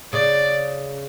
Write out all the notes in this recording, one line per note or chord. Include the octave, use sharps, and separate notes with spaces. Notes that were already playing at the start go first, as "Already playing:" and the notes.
C#3 D5